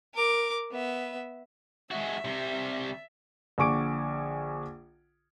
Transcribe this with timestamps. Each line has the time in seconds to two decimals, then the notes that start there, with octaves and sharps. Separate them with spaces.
0.14 A#4 D6
0.71 B3 E5
1.91 G#3 F#4 E5
2.25 C3 G3
3.58 A#1 D3 G#5 C#6 D6 D7